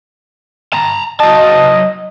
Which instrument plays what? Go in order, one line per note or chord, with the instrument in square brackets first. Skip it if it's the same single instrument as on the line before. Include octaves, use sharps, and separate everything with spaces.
[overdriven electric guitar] A5 A#5
[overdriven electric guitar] F#3 A5 [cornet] D#5